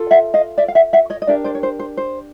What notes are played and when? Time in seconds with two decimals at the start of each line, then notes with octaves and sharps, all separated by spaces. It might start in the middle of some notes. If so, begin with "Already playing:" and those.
Already playing: F4 A4
0.11 E5 F#5
0.34 D#5 F5
0.58 D5 E5
0.68 F5
0.75 E5 F#5
0.93 E5 F#5
1.10 C#5 D#5
1.22 D#5
1.27 D4 G4 A#4 D5 E5
1.44 C5 D5
1.55 C#5
1.63 C5
1.79 C5
1.97 C5